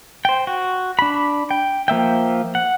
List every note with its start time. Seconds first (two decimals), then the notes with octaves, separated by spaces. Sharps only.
0.25 C5 G5
0.47 F#4
0.99 D4 B5
1.51 G5
1.88 F3 A#3 E5 G5
2.55 F#5